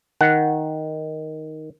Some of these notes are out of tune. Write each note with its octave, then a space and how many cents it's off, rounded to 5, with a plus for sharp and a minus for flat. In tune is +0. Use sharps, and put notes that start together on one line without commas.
D#3 +0 F#5 +0